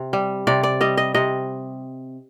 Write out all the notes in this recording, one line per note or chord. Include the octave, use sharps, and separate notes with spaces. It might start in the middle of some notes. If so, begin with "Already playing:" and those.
Already playing: C3
G3
C3 D5
D5
G3 D#5
D#5
C3 D#5